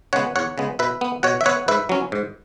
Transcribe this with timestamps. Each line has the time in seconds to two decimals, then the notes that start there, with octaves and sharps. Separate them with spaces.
0.13 C#3 G#3 B3 C#5 F#5
0.36 E2 C#5 F#5
0.58 C#3 G#3 B3
0.79 B2 B4 E5
1.01 B3
1.23 B2 C#5 F#5
1.41 E5
1.46 B3 C#5 F#5
1.68 G#2 B4 E5
1.89 F#3 C#4
2.12 G#2